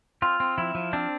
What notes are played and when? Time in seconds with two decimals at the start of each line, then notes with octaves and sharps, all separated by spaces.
0.22 C4 F4
0.40 C4
0.58 F3 E4
0.75 F3
0.93 C4 D4